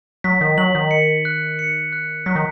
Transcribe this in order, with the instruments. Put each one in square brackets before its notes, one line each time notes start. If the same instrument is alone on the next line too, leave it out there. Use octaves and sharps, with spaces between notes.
[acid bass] F#3 [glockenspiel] B6
[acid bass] D#3
[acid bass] F#3 [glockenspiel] F#7
[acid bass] D#3
[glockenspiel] C#7
F#6
C#7
F#6
[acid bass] F#3 [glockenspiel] B6
[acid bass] D#3